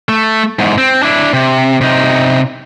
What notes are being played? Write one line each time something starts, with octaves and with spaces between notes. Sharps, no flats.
A3
E2 G#2
C4
D4 E4
C3
C3 D#4